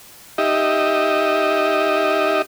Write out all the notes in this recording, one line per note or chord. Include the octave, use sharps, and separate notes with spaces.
D#4 G4 D#5 E5